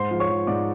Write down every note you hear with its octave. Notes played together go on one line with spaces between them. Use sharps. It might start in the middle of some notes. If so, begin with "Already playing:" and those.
Already playing: G#2 C5 C6
F3
C#5 C#6
F3
G#2 D5 D6